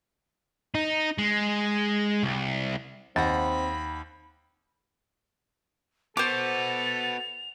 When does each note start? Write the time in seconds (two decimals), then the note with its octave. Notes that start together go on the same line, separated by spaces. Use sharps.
0.75 D#4
1.18 G#3
2.23 C2
3.16 D#2 C4 F#5 B5 A6
6.17 B3 F#4 A4 C5 D6 F7